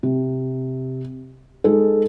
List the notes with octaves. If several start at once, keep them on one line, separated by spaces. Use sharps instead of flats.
C3
G#3 D#4 A4